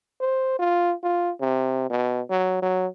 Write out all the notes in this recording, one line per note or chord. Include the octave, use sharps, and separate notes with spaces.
C5
F4
F4
C3
B2
F#3
F#3